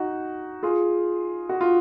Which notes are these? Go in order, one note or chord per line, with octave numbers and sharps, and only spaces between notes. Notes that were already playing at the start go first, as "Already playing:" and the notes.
Already playing: D#4 F#4
F4 G#4
F#4
F4